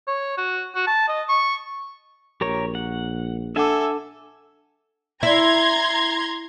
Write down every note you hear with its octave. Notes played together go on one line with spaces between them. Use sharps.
C#5
F#4
F#4
A5
D#5
C#6
A#1 G4 A#4 C#5
F#5
D4 A4 E5 F#5 G#5 D6
E4 A#5 C6 G#6